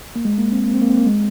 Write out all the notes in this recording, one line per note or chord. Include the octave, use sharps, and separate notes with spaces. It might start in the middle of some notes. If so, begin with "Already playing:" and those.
A#3
G#3
A#3
C4
A#3
C4
A#3
C4
A#3
G#3